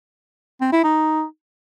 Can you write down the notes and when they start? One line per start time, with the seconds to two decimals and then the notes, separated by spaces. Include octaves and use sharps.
0.61 C4
0.72 E4
0.84 D#4